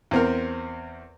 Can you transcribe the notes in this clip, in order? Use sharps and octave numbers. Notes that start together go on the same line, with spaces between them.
E2 C4 A#4